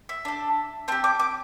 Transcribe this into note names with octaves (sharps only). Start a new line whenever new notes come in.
E5
D4 A4
C4 G4 A5
D6
D6